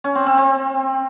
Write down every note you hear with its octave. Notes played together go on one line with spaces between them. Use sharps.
C#4
C4
C4
C4